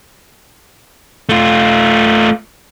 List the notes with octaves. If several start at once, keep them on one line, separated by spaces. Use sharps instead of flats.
A3 F4